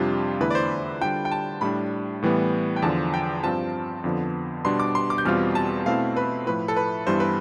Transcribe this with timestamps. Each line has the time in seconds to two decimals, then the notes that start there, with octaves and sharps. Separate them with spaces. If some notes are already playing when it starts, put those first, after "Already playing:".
Already playing: F2 C3 G3 D4 F4
0.40 E2 D3 A3 E4 B4
0.51 D5
0.55 C5
1.01 D3 G3 D4 F4 G5
1.25 G5
1.32 A5
1.61 A2 G3 D4 B5
2.22 A2 E3 G3 B3
2.76 G5
2.82 E2 D3 F3 A5
3.14 G5
3.43 G2 F3 C4 F4 A5
4.04 F2 D3 F3 B3
4.65 B2 G3 D4 C6
4.80 D6
4.95 C6
5.10 D6
5.18 G6
5.25 E2 B2 G3 C4 F4 F6
5.55 A5
5.86 B2 A3 C4 E4 F5
6.16 B4
6.46 A2 F3 A3 E4 B4
6.68 A4
6.76 B4
7.07 G2 E3 G3 B3 E4 C5
7.20 B4